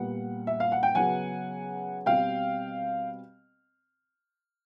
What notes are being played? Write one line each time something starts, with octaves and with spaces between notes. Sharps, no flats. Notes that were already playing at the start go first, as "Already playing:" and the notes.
Already playing: A#2 G3 B3 F#5
E5
F5
F#5
G5
C#3 F#3 B3 F#5 G#5
B2 G3 C4 F5 G5